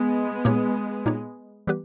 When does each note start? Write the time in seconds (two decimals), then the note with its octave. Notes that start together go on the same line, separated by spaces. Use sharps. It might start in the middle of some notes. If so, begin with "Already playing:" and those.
Already playing: G#3 B3
0.45 A#2 A#3 D#4 G4 C#5
1.06 A#2 A#3 D#4 G4 C#5
1.67 E3 G3 B3 G4 B4